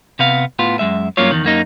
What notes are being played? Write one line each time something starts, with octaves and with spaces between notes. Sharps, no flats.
C3 B3 F5
A2 B3 F4
F#2 G#3 E5
G2 F#3 A#3 C#4 F4 C#5
E2 D#3
F#2 A#3 D#4